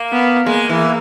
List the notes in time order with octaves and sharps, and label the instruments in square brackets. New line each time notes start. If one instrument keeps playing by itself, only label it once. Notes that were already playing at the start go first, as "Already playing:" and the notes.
Already playing: [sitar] A#3
[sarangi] B3
[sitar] G#3 [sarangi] A#3
[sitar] E3